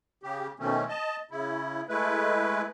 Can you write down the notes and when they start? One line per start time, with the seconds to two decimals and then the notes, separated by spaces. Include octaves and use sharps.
0.23 C#3 G4
0.60 B2 D#3 A3 C4 C#4
0.89 D#5 A5
1.31 C#3 E4
1.89 G#3 A3 E4 B4